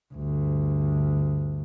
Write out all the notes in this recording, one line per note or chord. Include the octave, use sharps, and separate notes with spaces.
D2 G2